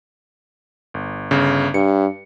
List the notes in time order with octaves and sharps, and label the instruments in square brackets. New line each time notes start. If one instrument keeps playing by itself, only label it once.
[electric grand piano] G1
G1 C#3
[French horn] G2 [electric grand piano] C#7